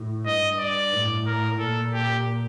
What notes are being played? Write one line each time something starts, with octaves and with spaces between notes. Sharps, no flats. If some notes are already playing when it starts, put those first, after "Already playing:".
Already playing: A2
G2 D#5
D5
A2
A#4
A#2 A4
G4